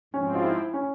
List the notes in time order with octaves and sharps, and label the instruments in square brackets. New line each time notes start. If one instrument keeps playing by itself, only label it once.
[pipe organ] G#2 F3 C4 [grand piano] C#4
[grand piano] F4
E4
C#4